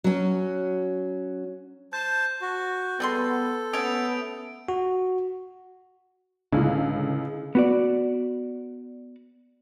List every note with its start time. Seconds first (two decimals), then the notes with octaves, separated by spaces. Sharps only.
0.04 F#3 C#4
1.93 C5 A5 G6
2.42 F#4
3.00 G3 B3 G#4 A4 C6
3.73 A3 B3 C#4 D#6 D7 F7
4.68 F#4
6.53 C#2 A2 D3 C#4 D4
7.55 B3 F#4 D5